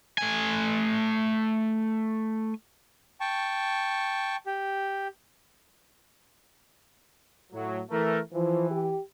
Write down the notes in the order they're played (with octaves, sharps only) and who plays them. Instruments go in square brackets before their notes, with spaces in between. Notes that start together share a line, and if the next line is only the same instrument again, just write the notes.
[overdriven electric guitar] A3 G#5
[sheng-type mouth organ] G5 A5 C#6
G4
[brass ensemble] A2 F#3
E3 A3 A#4
[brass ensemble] E3 [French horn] F3
[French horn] G4